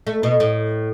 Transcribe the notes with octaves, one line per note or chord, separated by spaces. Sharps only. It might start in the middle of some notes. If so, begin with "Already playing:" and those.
A3
B2
A2